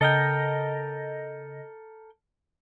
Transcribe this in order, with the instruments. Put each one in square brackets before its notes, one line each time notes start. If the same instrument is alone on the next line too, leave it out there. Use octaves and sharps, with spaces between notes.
[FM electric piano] C#3 D#5 A#6 [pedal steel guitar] A4 A#4 G5